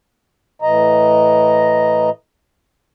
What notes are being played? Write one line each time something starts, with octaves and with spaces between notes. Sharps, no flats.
A2 E3 D#5 A#5